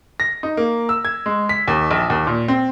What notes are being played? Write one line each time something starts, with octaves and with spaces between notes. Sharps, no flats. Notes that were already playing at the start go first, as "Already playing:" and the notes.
A#6
D#4
A#3
E6
G#6
G#3
B6
D#2
A#1
D#2
A#2
C4